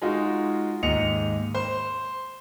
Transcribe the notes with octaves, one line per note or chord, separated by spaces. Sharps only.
G#3 D#4 F4 F#4 G#4
D#2 G#2 D#5 C#7 F7
C5